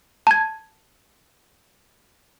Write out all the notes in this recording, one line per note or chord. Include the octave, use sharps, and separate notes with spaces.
A5 G#6